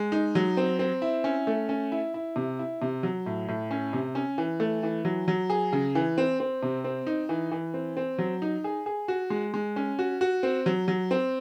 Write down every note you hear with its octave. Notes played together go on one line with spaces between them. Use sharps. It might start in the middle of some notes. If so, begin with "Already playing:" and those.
Already playing: G#3
D#4
F#3
C4
C4
E4
C#4
A3
C#4
E4
E4
C3
E4
C3
F#3
A2
A2
C#4
C3
C#4
E3
A3
E3
F#3
F#3
G#4
C#3
E3
C4
C4
C3
C4
D#4
E3
E3
C4
C4
F#3
D#4
G#4
G#4
F#4
G#3
G#3
C#4
F#4
F#4
C4
F#3
F#3
C4